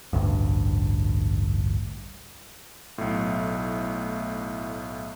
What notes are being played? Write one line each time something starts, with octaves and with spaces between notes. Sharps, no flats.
A1 D2 G2
B1 A2